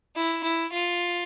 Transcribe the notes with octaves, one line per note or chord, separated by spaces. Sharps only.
E4
E4
F4